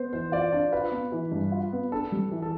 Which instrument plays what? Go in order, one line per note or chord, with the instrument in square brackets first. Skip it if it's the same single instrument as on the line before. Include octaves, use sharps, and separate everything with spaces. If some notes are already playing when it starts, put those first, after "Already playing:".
Already playing: [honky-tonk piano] B3 [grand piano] C5
[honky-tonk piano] E3 [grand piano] C5
[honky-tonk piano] F4 [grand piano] D5
[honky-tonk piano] D4 [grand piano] D5
[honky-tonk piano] F4 [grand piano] B4
[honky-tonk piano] B3
E3
G2
F4
B3
[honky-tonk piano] D4 [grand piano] A4
[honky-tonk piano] G3
E3
[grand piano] A4